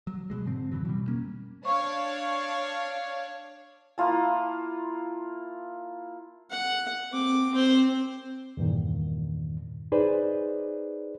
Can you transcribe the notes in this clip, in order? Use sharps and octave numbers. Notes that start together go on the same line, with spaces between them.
F#3
B2 F#3 G#3
G#2 D3 C4
F2 C#3 E3 F#3
B2 G3
A#3 C#4
D4 C#5 F5 C#6
A#3 E4 F4 A5
F#5
C4 D6
C4 C5
E2 G2 A#2 D#3
D#4 G#4 B4 C5 D5